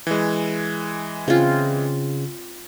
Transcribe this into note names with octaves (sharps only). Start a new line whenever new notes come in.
E3 G#3
C#3 C4 F4